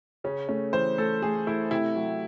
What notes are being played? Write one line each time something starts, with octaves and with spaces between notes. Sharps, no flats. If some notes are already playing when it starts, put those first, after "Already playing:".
C#3 C#4
A3 C#4
E3 C5
A3 A4
A3 G#4
A3 E4
C3 E4
F#3